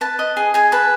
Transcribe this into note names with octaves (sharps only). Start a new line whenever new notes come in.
B4 A5
D#5
G#4
G#4 G#5
B4 A5